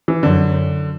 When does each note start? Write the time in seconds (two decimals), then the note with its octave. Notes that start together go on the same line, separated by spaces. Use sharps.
0.08 E3
0.23 F#2 D3